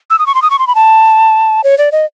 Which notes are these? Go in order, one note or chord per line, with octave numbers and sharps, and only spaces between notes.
E6
D#6
C#6
C6
D#6
C#6
C6
B5
A5
C#5
D5
D#5